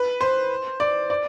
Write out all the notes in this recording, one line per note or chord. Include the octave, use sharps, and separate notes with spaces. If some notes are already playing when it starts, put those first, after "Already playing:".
Already playing: B4
C5
D5
D5